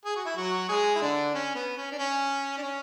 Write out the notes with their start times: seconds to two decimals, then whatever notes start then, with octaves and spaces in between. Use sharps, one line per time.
0.05 G#4
0.16 F#4
0.25 E4
0.37 F#3 F#4
0.69 G#3 G#4
0.96 E4
1.01 D3 D4
1.34 C#4
1.55 B3
1.77 C#4
1.92 D4
1.99 C#4
2.57 D4
2.62 C#4